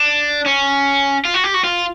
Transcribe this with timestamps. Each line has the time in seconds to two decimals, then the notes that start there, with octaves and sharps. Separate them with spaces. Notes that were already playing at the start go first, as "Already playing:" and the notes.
Already playing: D4
0.46 C#4
1.25 F4
1.34 F#4
1.44 G4
1.54 F#4
1.64 F4